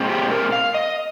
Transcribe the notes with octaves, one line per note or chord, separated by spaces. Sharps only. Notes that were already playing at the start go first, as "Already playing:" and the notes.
Already playing: A#2 G#3 C4
G4
A#4
F5
D#5